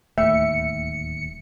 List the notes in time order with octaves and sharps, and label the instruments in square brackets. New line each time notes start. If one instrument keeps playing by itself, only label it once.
[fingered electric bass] D1 D#2 [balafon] A3 [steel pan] E5 [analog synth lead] C#7